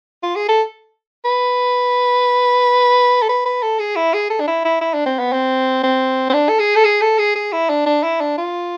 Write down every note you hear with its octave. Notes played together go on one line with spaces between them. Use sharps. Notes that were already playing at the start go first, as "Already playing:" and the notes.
F4
G#4
A4
B4
A4
B4
B4
A4
G#4
E4
G#4
A4
D4
E4
E4
E4
D4
C4
B3
C4
C4
C4
D4
A4
G#4
A4
G#4
A4
G#4
G#4
E4
D4
D4
E4
D4
F4